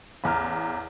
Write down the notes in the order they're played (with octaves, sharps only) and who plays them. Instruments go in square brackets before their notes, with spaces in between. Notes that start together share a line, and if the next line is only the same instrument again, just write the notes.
[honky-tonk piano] A1 E2 A#5 F6